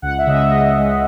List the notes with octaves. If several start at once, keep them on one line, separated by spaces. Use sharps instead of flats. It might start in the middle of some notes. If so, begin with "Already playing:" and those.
C#2 F#5
E5
C#3 G#3 D#5
E5
C#2 D#5
C#3 G#3